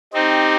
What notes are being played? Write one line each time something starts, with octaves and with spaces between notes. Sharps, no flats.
C4 D#4 G4